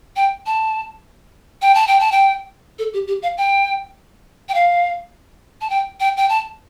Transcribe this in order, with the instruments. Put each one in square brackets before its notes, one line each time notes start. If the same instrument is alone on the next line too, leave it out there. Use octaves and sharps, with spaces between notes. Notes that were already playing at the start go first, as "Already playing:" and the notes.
[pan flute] G5
A5
G5
A5
G5
A5
G5
A4
G4
G4
F5
G5
G5
F5
A5
G5
G5
G5
A5